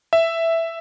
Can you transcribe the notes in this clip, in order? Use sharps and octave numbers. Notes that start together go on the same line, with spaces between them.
E5